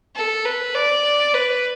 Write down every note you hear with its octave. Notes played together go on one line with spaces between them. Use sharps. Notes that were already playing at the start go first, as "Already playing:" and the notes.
A4
B4
D5
B4